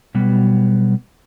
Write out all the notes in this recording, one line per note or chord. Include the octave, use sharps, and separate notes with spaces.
B2 F#3 G3 B3